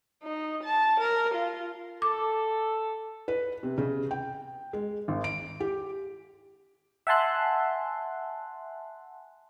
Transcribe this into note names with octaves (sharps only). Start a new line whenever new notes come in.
D#4
A5
A#4
F4
A4 D6
B4
C3
C#3
G5
G#3
G#1
D7
G4
E5 F#5 G#5 A5 C6 F#6